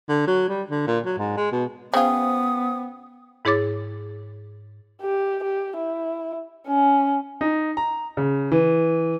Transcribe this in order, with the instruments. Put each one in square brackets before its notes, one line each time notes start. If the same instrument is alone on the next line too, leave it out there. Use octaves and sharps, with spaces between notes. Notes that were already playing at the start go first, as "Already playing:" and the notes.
[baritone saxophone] D3
F#3
G3
D3
A#2
F#3
G#2
G#3
B2
[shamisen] C#3 F4 [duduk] B3 [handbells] C5 G5 [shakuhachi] D#6
[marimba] G#2 E4 G#4 C#5 D6 A6
[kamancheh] G4
G4
E4
C#4
[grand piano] D#4
A#5
C#3
E3